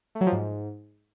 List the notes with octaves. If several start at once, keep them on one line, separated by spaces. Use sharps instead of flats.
A3
F#3
F3
G#2